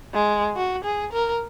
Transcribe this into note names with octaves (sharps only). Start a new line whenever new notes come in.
G#3
F#4
G#4
A#4